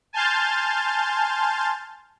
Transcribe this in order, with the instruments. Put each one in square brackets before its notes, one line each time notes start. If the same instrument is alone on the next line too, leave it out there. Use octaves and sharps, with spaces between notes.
[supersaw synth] G#5 A5 C6 F6 G6 A6